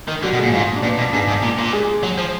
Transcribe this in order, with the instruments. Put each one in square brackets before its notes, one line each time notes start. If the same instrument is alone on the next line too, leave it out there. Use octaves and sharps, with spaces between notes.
[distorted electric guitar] D#3
[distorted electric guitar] D3 [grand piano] F#3 F#4
[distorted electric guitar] B2
[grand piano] G#3 G#4
[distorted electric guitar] A#2
[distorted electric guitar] G#2 [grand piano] F3 F4
[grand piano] D4
[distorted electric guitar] A#2 [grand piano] B3
[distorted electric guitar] B2
[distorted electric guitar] G#2 [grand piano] D4
[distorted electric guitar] G#2
A#2
A#2
[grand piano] G#3 G#4
[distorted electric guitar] F#3
F3